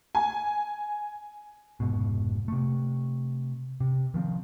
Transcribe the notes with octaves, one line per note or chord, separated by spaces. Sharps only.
G#5
F1 G#2 B2
C3 A3
C3
D#3 F3 B3 C4